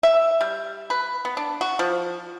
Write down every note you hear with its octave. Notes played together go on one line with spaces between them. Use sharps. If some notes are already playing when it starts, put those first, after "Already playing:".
E5
G3
B4
B3
D4
F#4
F3